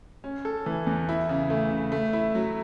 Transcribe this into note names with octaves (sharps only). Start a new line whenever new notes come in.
C#4
A4
E3
E2
E4
C#3
A3
C#3
A3
E4
F#3